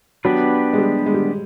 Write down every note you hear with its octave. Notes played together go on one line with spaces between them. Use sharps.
F#3 B3 D4 G4 B4
G#3
G3
G#3
G3